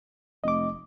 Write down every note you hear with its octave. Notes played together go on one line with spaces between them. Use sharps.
F1 D#5 D6